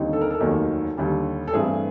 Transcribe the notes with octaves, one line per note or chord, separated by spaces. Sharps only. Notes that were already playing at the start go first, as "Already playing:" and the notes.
Already playing: D#2 D3 G3 C4 D#4
A4
A#4
A4
F1 D#2 D#3 F#3 A#3
D#2 D3 G3
A4
G2 E3 A3 C4 G#4